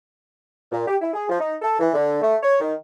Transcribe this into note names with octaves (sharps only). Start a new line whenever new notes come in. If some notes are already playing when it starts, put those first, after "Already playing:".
A#2
G4
E4
G#4
F3
D#4
A4
E3
D3
A3
C#5
D#3